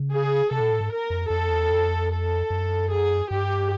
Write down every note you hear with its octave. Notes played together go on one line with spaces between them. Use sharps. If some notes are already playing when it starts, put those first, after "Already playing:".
Already playing: C#3
G#4
C3 A4
A#2
A2
G#2
A#4
F2
F2 A4
E2
F2
A4
F#2
G#4
G2 G4